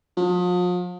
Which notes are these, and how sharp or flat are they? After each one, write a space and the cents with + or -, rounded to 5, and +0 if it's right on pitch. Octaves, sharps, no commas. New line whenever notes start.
F3 +40